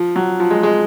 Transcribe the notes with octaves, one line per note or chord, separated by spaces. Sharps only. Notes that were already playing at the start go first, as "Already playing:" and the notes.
Already playing: F3
F#3
F3
G#3
G#3